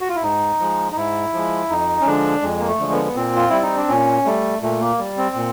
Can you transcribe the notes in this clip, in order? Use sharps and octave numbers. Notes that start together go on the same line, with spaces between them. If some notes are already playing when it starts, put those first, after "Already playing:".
F#4
F4
E4
G#2 D#4
F3 G#3
D#4
G#2 E4
F3 G#3
F2 D#4
C#4
D3 F3 G#3 D4
F2 G#3
A#3
A3
D3 F3 G#3
B3
B3
A#2 C4
F4
G3 E4
D#4
D4
A#2 C#4
G3 A3
A#2 A3
A#3
G3
C4
A#2